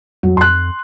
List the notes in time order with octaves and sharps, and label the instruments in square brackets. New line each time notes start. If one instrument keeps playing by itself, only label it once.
[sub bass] F2 [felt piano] F#3
[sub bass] F2 [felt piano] C6 F#6